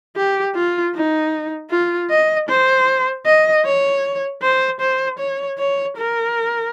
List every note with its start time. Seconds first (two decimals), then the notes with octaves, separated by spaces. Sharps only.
0.16 G4
0.55 F4
0.94 D#4
1.71 F4
2.10 D#5
2.49 C5
3.26 D#5
3.65 C#5
4.42 C5
4.81 C5
5.19 C#5
5.58 C#5
5.97 A#4